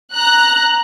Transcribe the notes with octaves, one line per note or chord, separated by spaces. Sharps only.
A#5 F#6